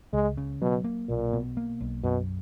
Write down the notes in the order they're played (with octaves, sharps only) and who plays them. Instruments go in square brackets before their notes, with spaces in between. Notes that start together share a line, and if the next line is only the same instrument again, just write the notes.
[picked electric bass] C#2 [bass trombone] G#3
[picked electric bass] C#3
[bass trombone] B2 [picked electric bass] F#3
[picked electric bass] A#3
[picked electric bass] B1 [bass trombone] A#2
[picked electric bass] B2
A#3
B1
[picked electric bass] F#2 [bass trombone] B2